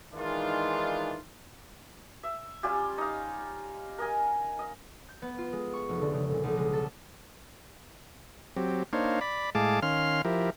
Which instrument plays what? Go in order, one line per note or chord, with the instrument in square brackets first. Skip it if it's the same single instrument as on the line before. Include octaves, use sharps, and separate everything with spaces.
[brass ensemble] D#3 E3 G#3 D4 D#4 F4
[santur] E5
G3 C#4 F4 G4
D#4 F5
A#4 D#5 G#5
D#5
[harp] G6
B3
F4
G#3
C#6
F1
D3
C#3
A#2
B1
G#3
A4
[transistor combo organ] F#3 C4 G4
A#3 D4 D#4 C5 C#5 F5
D5 B5
A2 G#3 G#4 F5 A5 D6
D#3 C#4 F5 C6 F6
F3 E4 G4 A#4